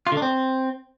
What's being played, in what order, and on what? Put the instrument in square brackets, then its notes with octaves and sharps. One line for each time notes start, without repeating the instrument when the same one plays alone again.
[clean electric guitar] F4
D3
D4
C4